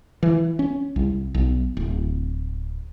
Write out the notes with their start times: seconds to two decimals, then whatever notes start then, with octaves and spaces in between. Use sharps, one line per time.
0.23 E3
0.59 C#4
0.96 C2
1.34 B1
1.77 D1